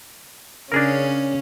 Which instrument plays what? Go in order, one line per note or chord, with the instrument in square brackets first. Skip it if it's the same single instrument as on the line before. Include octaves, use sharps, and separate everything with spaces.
[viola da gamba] C#3 C#4 [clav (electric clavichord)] D4 G#4 A#4